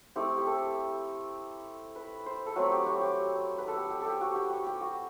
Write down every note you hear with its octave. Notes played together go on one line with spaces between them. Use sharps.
A3 C4 E4 G4
G4
A4
B4
C5
A4
F#3 A3 C4 B4
G4
F#4
G4
B4
A4
G4
G4
G4 A4
F#4
G4
G4
G4
F#4